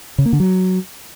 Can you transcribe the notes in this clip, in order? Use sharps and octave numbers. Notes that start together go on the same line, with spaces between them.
C#3
A#3
D3
F#3